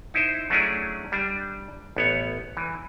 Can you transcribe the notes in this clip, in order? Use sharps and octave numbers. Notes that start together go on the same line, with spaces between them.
D#4 E4 C5
F#3 A3 C#4 D4 E4 G#4
G3 D4
A1 B3 C#5
E3